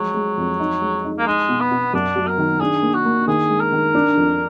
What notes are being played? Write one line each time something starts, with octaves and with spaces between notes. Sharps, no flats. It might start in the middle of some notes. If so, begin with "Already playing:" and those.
Already playing: F3 F#3 G#3
G#3
F2
D#4
G#3
D#4
A#3
G#3 D#4
B2
B3
B2
F#2 D4
F#3
A#4
D#3
D4 G#4
A#3
F#4
A#3
D#3 G#4
G#3
A#4
D#3
D4
F2